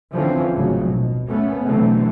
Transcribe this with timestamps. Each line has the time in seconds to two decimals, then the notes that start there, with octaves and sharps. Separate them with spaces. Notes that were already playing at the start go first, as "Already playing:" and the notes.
0.12 D3 E3 F3 C4 C#4
0.54 G#1 D2 A2 C#3 F3 F#3
0.90 B2
1.27 A3 B3 C#4
1.67 B2 D3 E3 F#3 A3 C4